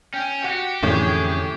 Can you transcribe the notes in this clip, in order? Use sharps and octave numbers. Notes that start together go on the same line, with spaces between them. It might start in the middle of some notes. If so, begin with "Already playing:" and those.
C#4 G5
F#4 G4 F#5
F2 A2 D3 E3 C#4 G#4